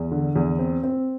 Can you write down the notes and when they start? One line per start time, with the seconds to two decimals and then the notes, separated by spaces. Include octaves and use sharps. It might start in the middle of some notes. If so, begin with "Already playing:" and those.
Already playing: E2
0.11 D3
0.36 E2
0.59 C4
0.83 C4